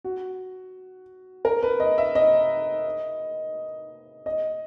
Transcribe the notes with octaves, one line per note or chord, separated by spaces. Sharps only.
F#4
A#4
B4
D#5
E5
D#5
D#5